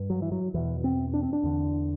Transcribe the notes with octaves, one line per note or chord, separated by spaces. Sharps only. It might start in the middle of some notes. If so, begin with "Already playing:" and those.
Already playing: G2
F#3
E3
F#3
E2 B2 E3
C4
D4
C4
D4
E2 D3